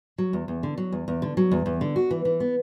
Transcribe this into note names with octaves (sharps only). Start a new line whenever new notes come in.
F#3
E2
E2
D3
F#3
E2
E2
D3
F#3
E2
E2
D3
F#4
E3
E3
B3